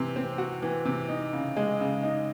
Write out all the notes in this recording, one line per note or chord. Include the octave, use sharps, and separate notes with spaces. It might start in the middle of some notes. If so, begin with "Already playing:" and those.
Already playing: C3 E3
C4
F#4
E3
C3
D#4
C#3
G#3
C#3
D#4